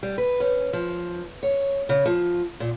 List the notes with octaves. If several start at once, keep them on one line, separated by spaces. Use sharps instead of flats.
G3
B4
C#4
F3
C#5
C#3
F3
A#2